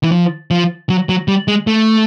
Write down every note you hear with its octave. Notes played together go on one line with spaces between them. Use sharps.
E3
F3
F3
F#3
F#3
G3
G#3
A3